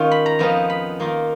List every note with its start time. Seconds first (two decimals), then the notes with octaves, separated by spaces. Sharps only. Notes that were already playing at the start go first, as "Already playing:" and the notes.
Already playing: D#3 C#4 D#4 F4
0.11 B5
0.26 A#5
0.39 F2 F3 B3 D#4
0.70 B5
1.00 D#3 A#3 F4